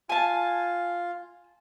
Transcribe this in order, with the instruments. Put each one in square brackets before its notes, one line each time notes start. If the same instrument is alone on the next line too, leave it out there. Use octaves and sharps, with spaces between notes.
[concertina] F4 [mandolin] G#5 A5